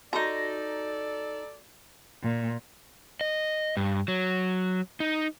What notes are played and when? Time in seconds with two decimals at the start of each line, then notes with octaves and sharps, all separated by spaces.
0.13 D#4 F#4 G4 A4 D5 A#5
2.23 A#2
3.21 D#5
3.77 G2
4.08 F#3
5.00 D#4